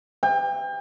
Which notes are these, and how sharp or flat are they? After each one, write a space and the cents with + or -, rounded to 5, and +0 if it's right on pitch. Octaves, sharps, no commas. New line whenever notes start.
G5 +35